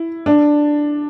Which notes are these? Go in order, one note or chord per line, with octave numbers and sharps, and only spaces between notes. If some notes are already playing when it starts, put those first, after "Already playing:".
Already playing: E4
D4